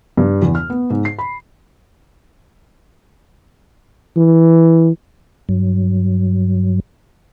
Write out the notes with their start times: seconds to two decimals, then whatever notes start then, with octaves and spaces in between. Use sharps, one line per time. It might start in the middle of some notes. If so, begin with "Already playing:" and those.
0.17 G2
0.42 E2
0.55 F6
0.70 B3
0.90 G#2
1.05 C7
1.19 B5
4.16 E3
5.49 G2 F#3